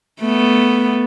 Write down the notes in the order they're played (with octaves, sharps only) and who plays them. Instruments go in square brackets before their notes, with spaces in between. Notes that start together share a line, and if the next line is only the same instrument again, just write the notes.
[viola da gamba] A3 B3